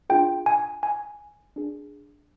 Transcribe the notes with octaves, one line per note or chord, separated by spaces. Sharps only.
D4 F4 G#4 G5
G#5
G#5
D4 G#4